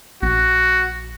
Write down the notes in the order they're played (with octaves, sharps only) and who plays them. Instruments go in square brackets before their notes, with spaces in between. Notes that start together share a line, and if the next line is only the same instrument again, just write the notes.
[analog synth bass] A#1 [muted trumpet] F#4